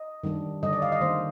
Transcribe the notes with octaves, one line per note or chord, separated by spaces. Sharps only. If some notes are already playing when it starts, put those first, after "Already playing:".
Already playing: D#5
D#3 G3 D4
D3 G3 D4 D#5
D5
F5
D#5
D#3 A#3 D4 C5